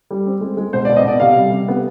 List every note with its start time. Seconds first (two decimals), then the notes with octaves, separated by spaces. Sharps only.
0.10 G3
0.26 C4
0.41 G#3
0.57 G#3
0.73 B2 C5
0.85 D5
0.89 B2
0.96 D#5
1.04 B2 D5
1.20 C3 F5
1.36 G3
1.52 C3
1.68 B3